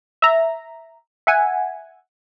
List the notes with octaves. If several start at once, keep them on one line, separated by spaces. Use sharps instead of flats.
E5 A#5
E5 F#5 G#5